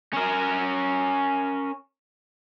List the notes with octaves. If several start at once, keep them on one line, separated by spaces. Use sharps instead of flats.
C#4 A#4